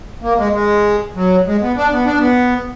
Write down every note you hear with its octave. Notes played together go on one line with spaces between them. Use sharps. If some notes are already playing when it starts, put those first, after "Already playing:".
A#3
G#3
G#3
F#3
G#3
B3
D4
B3
D4
B3